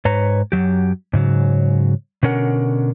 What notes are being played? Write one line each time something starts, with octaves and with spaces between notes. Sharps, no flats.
G#2 B4 C#5 A#5
F#2 B2 F#3 G4
G#2 C#3 F#3
B2 D3 C#4 A#4 F#5